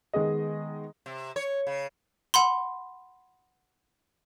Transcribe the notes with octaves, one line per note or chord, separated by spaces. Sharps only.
D#3 G#3 B3 G#4 D#5
C3
C#5
C#3
F#5 B5 C6